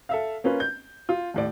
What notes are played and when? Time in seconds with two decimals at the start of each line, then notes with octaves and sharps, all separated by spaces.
0.09 A4 E5 F5
0.44 A#3 C#4 F4 B4
0.60 G6
1.09 F4
1.34 D#2 A2 D5